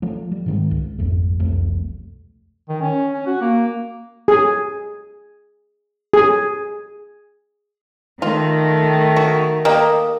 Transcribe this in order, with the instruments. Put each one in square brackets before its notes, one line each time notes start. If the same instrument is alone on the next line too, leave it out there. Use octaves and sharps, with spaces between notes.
[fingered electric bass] F3 A3
G3
G#2 D#3 G#3
C#2
G#1 F2 A3
E1 C2 F2 A3
[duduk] D#3
C#4
C#4
F#4
A#3
[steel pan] G#4
G#4
[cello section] D#3 A3 [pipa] F4
[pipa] F#4
A#3 G4 D#5